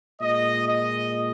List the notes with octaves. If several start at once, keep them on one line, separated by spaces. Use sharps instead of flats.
A#2 G#3 D#5
D#5